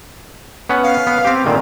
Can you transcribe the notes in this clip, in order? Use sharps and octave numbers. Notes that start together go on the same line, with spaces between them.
B3 C#4 F#5
F5
B3
C4 G4
A#2 D3 D#3